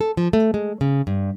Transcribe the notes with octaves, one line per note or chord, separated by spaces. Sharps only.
A4
F3
A3
G#3
C#3
G2